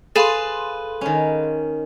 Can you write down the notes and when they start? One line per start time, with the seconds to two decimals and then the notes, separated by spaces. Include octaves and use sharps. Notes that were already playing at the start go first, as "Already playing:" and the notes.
0.16 G#4 A4 B4 F5 C6
1.01 D#3 C#4